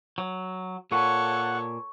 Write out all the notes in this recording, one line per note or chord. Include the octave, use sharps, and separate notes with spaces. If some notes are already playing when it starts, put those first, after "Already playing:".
F#3
A#2 A4 C#5 F#5 C#6